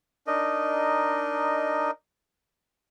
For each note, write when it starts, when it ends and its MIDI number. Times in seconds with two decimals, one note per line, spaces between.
0.27 1.91 62
0.27 1.91 63
0.27 1.91 70
0.27 1.91 75